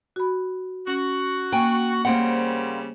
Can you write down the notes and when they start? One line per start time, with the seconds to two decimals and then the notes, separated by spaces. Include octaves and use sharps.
0.16 F#4 B5
0.87 C#4 F#4
1.52 A#3 G5 G#5
2.05 C#3 G3 A#3 C4 C5 F#5